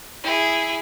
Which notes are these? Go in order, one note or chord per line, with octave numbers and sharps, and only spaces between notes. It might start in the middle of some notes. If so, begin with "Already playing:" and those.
E4 G#4